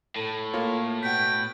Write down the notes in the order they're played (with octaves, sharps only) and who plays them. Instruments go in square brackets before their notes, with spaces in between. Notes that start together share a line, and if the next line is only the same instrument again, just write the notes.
[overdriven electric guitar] A2 [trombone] A4
[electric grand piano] A#3 F4 C#5
[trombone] B2 [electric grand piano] F#5 B6 [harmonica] G5